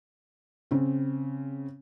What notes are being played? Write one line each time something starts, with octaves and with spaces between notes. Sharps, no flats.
C#3 C4